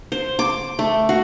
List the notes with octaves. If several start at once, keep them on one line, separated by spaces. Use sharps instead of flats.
C5
D6
A3
F#4